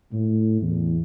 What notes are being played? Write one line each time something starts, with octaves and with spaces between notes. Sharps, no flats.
A2
E2